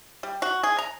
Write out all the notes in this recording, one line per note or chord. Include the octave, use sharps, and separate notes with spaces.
G3
F#4
G#4
A#5